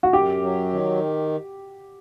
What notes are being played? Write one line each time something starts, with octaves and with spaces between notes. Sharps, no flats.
F#4
F#2 G4
F#3
D#3